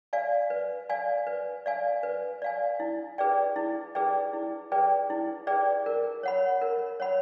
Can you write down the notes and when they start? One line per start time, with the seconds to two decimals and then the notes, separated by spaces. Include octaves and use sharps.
0.13 D5 F5 G#5
0.50 B4
0.89 D5 F5 G#5
1.27 B4
1.66 D5 F5 G#5
2.03 B4
2.42 D5 F5 G#5
2.80 E4
3.18 G#4 B4 D5 G5
3.56 E4
3.95 G#4 B4 D5 G5
4.33 E4
4.72 G#4 B4 D5 G5
5.10 E4
5.47 G#4 B4 D5 G5
5.86 A#4
6.23 C#5 F#5 B5
6.61 A#4
7.00 C#5 F#5 B5